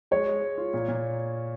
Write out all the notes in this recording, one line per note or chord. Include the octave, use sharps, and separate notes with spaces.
G#3 C#5
G#3
G#3
F4
A#2
A#2